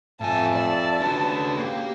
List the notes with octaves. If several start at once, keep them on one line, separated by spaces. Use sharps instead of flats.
F2 A2 E5 G#5 A5
D5 A5
C#3 D4 F#4 B4
A#3 G4